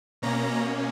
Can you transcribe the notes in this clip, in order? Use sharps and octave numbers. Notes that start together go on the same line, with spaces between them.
B2 A#3 C#4 A#5